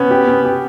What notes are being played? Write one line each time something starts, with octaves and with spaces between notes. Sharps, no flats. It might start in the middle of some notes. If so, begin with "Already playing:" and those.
Already playing: B3 C#4
G4
C#4
G4